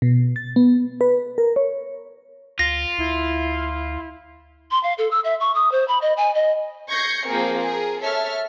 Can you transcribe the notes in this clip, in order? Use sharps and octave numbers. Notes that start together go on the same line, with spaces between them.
B2
A6
B3
B4
A#4
C#5
D2 F4 A#6
D2 E4
C6
F5
A4
E6
E5
C#6
D#6
C5
B5
D#5
G#5
D#5
C#6 G6 G#6 A#6 C7 C#7
F3 A#3 C4 G#4 A#4
G#4 A#4
A4 C#5 E5 A5 F6